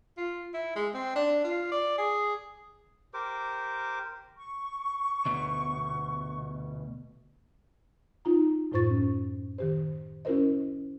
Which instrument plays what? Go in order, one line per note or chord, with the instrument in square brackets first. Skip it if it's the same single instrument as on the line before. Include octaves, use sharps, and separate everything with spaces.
[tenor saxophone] F4
E4
G#3
C4
D4
F4
D5
G#4
[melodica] G4 A#4 C5 D6
[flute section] C#6
[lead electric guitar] D2 B2
[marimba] D#4 F4 A#5
F#2 A2 F4 C5 C#6 A6
C#4
D#3 G4 C5
C#4 E4 F#4 A#4 C5 D#5